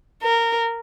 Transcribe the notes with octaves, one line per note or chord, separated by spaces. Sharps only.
A#4